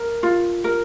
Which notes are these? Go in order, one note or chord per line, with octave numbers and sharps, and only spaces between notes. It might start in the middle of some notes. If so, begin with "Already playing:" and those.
Already playing: A#4
F4
A#4